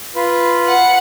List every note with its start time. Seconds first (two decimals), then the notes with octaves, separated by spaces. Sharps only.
0.16 F4 B4
0.68 F#5